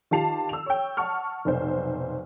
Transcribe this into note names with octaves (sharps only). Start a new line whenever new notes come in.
D#3 F4 G4 A5 C7 F7
E6 F7
C#5 G5
F#5 A5 C#6 F6
F1 B1 C5